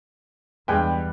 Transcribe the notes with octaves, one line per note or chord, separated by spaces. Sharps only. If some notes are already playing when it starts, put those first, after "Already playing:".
E2 G2 G3 G#3 B4 G5 G#5